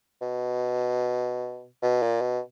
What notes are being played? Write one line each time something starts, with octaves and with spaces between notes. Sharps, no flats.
B2
B2
A#2
B2